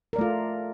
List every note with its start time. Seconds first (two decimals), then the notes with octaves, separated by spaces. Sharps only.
0.13 A#4
0.16 D5
0.18 A3
0.21 F4